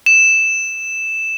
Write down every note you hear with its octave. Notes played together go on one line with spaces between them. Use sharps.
E7